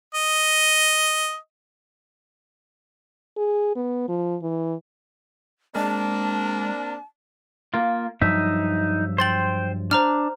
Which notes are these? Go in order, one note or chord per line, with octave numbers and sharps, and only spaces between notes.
D#5
G#4
B3
F3
E3
G#3 A#3 C4 D4 A5
A#3 F4
G2 F3 F#3 D#4 E5
C5 G5 C6 A6 F#7
D4 C5 A#5 F6